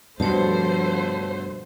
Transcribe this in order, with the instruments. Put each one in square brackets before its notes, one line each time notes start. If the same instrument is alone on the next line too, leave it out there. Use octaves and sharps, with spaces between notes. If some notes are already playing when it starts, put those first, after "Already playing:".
[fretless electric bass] G2 B2 [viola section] D3 A3 C5 [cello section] F3 [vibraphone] C#5 A5